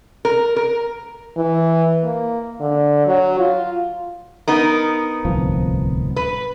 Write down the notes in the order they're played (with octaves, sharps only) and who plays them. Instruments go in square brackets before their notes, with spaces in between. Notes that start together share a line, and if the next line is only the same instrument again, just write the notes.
[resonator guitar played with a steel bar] A#4
A#4
[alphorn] E3
A#3
D3
F#3
F4
[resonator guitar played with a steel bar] B3 D#4 A#4
[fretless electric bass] D1 C2 F3
[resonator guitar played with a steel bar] B4